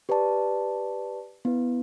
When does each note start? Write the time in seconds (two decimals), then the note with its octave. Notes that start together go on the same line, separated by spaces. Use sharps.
0.09 G4 B4 D5 A5
1.45 B3 E4 B4